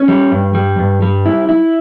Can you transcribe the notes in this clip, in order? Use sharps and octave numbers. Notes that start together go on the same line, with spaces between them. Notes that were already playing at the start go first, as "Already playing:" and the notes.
Already playing: C#4
G3
G2
G3
G2
G3
E4
E4